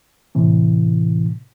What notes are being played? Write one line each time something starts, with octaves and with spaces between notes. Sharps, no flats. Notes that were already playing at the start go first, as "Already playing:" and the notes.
A2 C3 E3